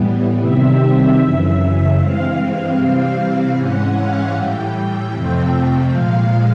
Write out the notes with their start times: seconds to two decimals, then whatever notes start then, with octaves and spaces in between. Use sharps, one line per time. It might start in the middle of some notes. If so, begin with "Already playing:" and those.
Already playing: A2 E3 G3 B3
0.40 C3 D#3 G3 C4 E5
1.19 F#2 C#3 E3
1.97 G2 E3 G#3 C4 F5
2.75 C3 E3 G3 C4
3.54 G#2 E3 G#3 C#4 F#5
3.94 F5
4.32 A2 E3 G3 G5
5.10 F2 C3 F3 A3 C4
5.89 A#2 F3 G#3 F5